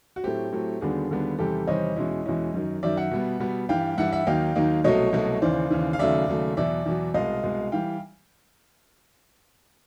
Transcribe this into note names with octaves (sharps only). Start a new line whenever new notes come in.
F#4
A2 F#3 A3 C4 G4
A2 F#3 A3 C4
D#2 D3 G3 B3 D4 F#4 G#4
D#2 D3 G3 B3 D4
E2 C3 D#3 G3 C4 G4 A4
E2 C3 D#3 G3 C4 C#5 D#5
E2 B2 G#3 C#4 E4
E2 B2 G#3 C#4 E4
F#2 D#3 F#3
F#2 D#3 F#3 D5 E5
E5 F#5
B2 G3 B3
B2 G3 B3
G2 E3 G3 F5 G5
G2 E3 G3 E5 F#5
E5 F#5
D#2 D#3 F#3 A#3 D#4 F5 G5
D#2 D#3 F#3 A#3 D#4
C2 B2 F#3 A3 C#5 D#5
C2 B2 F#3 A3
D#2 C#3 E3 C5 D5
D#2 C#3 E3
F5
D#2 C#3 F#3 A3 D5 E5
D#2 C#3 F#3 A3
E2 B2 F#3 D5 E5
E2 B2 F#3
C2 B2 G#3 D#5 F5
C2 B2 G#3
E3 G3 F5 G5